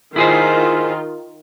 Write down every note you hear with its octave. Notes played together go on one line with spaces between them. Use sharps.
D#3 E4 F4 G#4 C5